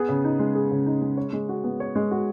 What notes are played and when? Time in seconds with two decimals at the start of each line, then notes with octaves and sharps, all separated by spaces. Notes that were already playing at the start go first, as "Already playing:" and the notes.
Already playing: B3 G#4
0.09 C#3
0.24 D#4
0.39 G#3
0.55 G#4
0.71 C#3
0.86 D#4
1.01 G#3
1.17 C#5
1.33 G#3
1.49 F#4
1.64 B3
1.80 C#5
1.95 G#3
2.11 F#4